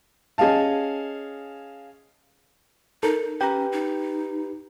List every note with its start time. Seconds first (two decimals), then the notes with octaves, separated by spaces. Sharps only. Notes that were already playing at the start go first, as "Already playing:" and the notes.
0.38 C#4 G#4 D#5 F5 A5
3.03 D#4 A4 A#4
3.41 C#4 G4 B4 G5 A#5
3.72 D#4